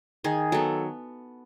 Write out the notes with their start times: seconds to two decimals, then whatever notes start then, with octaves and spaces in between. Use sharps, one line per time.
0.24 D#3 G#4
0.52 F#3 B3 A4